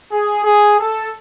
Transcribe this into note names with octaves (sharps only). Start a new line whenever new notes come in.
G#4
G#4
A4